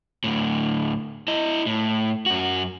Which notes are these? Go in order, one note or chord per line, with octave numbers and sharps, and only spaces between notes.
D2 A2
E4 D#5
A2
F#2 F#4